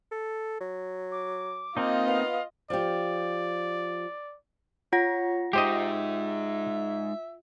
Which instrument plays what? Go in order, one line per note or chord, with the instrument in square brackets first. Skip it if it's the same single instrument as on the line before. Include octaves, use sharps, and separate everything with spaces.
[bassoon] A4
F#3
[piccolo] D6
[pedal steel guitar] A#3 C4 D#4 [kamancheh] F4 D#5
[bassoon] B3 [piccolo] F5
[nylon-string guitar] F3 G4 [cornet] D5
[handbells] F4 F#5 A#6 [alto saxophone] C#5
[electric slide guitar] G#3 D#4 [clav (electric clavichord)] G4 C5 D#5 [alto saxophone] E5